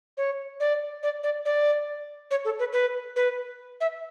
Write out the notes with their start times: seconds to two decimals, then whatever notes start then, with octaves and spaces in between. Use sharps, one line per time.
0.17 C#5
0.60 D5
1.03 D5
1.23 D5
1.45 D5
2.31 C#5
2.45 A4
2.59 B4
2.73 B4
3.16 B4
3.81 E5